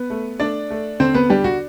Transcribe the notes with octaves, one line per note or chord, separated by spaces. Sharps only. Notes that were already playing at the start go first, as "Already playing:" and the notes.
Already playing: B3 B4
A3
A3 D4 D5
A3
D3 C4 C5
B3 B4
G3 D4 G4
F#4